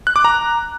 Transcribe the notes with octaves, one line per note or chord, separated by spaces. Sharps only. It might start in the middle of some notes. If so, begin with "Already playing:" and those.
F#6
D6
A#5